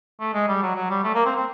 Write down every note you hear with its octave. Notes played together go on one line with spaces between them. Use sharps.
A3
G#3
G3
F#3
F#3
G3
A3
A#3
C4
C4